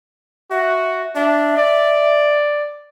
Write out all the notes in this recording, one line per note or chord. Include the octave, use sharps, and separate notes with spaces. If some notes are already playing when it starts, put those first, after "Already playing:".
F#4 E5
D4 E5
D5